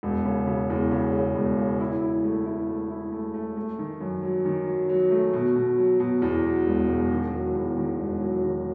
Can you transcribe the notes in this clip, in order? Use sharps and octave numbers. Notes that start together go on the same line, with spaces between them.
E1
C#3
C#3
E2
C#3
C#3
E1
C#3
E4
E4
A3
E4
A3
E4
A3
A3
A3
D#3
F#2
F#3
D#3
F#3
F#3
A3
B2
B2
F#3
B2
E2
F#3
E1
E1
D#3
F#3
E2
D#3
E1
F#3
D#3